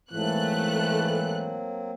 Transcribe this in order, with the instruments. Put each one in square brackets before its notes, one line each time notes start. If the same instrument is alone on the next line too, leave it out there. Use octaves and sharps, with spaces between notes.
[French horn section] G#2 E3 [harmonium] F#3 A#3 C4 [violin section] A3 F#6